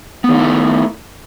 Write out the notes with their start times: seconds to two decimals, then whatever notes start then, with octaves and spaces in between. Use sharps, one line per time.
0.24 B3
0.29 D#3
0.34 D#4
0.39 E4
0.44 A3